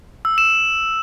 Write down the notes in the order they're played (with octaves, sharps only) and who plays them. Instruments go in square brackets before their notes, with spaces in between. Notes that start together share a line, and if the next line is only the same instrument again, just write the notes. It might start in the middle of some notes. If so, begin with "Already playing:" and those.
[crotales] E6
E7